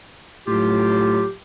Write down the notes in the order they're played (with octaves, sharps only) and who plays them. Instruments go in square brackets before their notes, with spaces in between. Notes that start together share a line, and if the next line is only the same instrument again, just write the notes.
[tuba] A2 [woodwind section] F#3 F4 G4